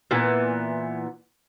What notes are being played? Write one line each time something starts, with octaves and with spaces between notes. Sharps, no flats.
A#2 E3 B3